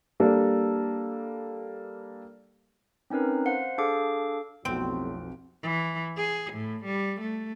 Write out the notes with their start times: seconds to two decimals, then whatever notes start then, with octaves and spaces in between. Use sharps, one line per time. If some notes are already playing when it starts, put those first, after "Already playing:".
0.20 G3 A#3 D4 A4
3.10 C4 C#4 D#4 A#4 B4
3.46 C5 F5 F#5
3.78 D4 G#4 A4 F5 D6
4.65 B1 F2 A2 G3 C4 F#4 D7
5.63 E3
6.17 G#4
6.53 A2
6.85 G3
7.21 A3